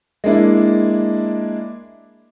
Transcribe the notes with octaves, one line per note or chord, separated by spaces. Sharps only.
G#3 A#3 D4 E4